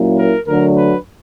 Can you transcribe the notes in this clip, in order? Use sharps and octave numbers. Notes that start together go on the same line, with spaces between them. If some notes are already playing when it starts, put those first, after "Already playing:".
Already playing: A#2 F#3 A#3 C#4 E4
A#4
D2 D3 F#3 A3 D4 A#4
B4